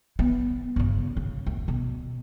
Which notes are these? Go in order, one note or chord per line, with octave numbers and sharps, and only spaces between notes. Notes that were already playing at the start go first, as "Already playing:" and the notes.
B3
G1 C#3
C#3
D2
B2